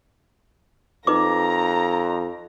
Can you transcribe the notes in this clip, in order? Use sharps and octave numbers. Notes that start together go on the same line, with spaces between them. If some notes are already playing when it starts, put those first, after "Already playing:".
F2 D#4 B4 A#5 D6